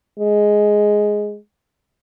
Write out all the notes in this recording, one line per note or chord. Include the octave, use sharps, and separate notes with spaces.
G#3